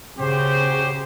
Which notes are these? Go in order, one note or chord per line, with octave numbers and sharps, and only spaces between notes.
C#3 F#4 G4 C5